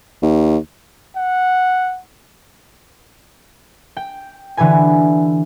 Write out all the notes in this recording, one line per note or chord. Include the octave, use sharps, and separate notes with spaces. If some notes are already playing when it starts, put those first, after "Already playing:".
D#2
F#5
G5
D3 E3 G4 B4 G#5